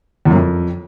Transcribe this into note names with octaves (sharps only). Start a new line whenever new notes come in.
E2
F#2
F2